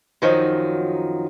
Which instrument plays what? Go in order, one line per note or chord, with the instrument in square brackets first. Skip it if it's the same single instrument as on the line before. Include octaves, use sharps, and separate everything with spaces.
[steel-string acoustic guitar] F#2 D#3 F3 F#3 D#4